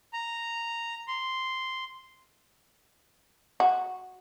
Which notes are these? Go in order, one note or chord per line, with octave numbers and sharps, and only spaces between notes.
A#5
C6
F#4